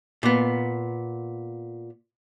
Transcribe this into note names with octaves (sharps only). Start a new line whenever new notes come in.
A#2 B3